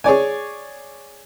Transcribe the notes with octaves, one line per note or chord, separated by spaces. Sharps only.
G#4 C#5 D5 G#5